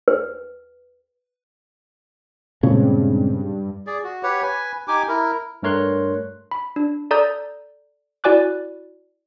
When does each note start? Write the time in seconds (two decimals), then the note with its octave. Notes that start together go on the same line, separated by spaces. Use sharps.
0.08 B4
2.63 G2 A#2 C#3 G#3 C4
3.87 G#4 D5
4.04 F#4
4.23 G4 B4 C#5 F#5
4.43 B4 G#5
4.88 D#4 G4 G#5 D6
5.08 E4 A#4
5.63 G2 A3 A#4 C#5 C6 F#6
6.51 B5
6.76 D4
7.11 A4 D5 A#5 D#6 G6
8.24 E4 F#4 D5 G#5 D6 F#6